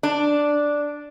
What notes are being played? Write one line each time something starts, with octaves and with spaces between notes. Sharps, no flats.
D4